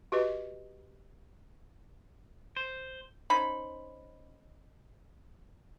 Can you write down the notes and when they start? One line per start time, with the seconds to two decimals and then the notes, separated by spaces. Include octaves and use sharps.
0.12 F#4 G4 B4 D#5
2.57 C5
3.30 C#4 D#4 C5 B5